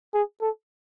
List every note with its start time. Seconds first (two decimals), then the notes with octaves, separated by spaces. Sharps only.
0.14 G#4
0.41 A4